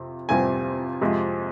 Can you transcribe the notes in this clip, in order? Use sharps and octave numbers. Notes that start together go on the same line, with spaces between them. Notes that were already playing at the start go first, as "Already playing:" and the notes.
Already playing: F2 C3 F4
F2 C3 G3 C4 F4 G#5
F2 C3 F3 G#3